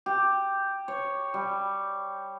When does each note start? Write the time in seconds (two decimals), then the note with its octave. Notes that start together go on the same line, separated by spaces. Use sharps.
0.06 G4
0.88 C#5
1.34 G3